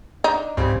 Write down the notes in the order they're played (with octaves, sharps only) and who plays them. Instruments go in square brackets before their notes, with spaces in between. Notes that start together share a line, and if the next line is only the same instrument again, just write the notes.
[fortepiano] D4 [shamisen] D#4
[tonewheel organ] C#2 G#2 [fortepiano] C#3 G3 C4